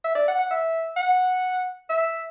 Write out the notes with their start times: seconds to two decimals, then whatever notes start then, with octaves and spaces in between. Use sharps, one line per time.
0.04 E5
0.15 D5
0.28 F#5
0.39 F#5
0.51 E5
0.97 F#5
1.90 E5